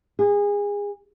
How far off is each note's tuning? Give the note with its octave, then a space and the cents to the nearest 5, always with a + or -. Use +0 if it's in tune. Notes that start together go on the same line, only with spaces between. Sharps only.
G#4 -25